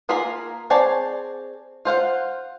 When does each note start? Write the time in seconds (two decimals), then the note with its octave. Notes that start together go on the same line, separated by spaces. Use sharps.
0.09 A#3 F4 G#4 A#4 B5
0.70 C4 G#4 C#5 D5 A5
1.85 F4 C5 F5 F#5